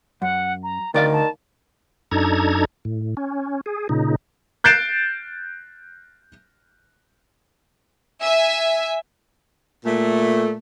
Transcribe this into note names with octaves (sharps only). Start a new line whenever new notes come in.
F#2 F#5
A#5
D2 D#3 D5 F5 A6
A5
F#2 D4 D#4 A4 A#5 G#6
A2
C#4
G#4
A#2 C#3 D#4
F#6 G6 A6 C7 D7 E7
E5 G#5
A#2 A3